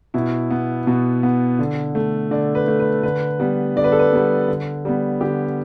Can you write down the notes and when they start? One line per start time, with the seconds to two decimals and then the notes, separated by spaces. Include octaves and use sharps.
0.14 B2 E4
0.50 B3
0.87 B2
1.23 B3
1.59 D3
1.95 A3
2.31 D3 D5
2.55 B4
2.68 A3
2.80 B4
3.03 D3 B4
3.40 G3 B3
3.76 D3 D5
3.84 B4
3.92 A4
3.99 B4
4.12 G3 B3
4.48 D3
4.85 G3 B3
5.21 D3 G4